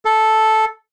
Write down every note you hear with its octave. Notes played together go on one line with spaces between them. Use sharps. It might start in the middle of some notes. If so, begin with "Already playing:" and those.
A4